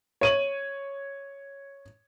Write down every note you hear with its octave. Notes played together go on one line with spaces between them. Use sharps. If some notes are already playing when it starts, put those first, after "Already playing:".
C#5 D#7 F#7